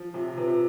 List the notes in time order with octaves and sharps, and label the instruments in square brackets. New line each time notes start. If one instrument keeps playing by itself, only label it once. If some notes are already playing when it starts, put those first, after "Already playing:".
Already playing: [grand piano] F3
[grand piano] C3 [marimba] F4
[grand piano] C3 [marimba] B4